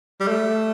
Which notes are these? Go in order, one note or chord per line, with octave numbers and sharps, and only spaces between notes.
G3
A3